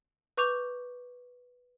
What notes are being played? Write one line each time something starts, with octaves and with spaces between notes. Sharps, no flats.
B4 C#6 D6 G6 F7